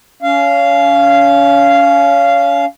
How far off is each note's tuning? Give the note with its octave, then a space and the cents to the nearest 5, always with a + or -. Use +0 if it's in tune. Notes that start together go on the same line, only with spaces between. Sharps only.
C#4 +30 F5 -15